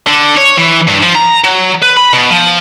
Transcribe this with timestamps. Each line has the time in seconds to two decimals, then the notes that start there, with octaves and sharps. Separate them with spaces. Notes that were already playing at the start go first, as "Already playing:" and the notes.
0.07 D3
0.37 C#5
0.58 E3
0.88 G2
1.03 F3
1.16 A#5
1.44 F#3
1.82 B4
1.97 B5
2.14 B2
2.31 F3